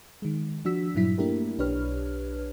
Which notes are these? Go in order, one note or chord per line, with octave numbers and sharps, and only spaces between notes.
D#3 G#3
F3 D4 F#4 E6 B6
G2 A#2 F#3 E4 B6
A3 A#3 D4 E4 G4 A#4
B1 D4 G4 B4 C#5 F6